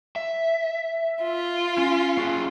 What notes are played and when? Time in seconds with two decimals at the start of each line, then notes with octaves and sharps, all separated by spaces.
0.16 E5
1.23 F4
1.78 C#4
2.17 C#4 F#4 G#4